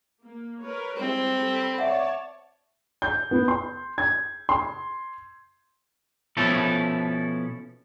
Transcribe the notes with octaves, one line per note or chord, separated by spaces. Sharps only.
A#3
A#4 B4 C#5
G3 G#3 C4 E4
G3 A4 B5
C#5 D5 E5 F#5 A5
G6
B3
C6
G#6
C6
B2 F3 C#4 E4 A4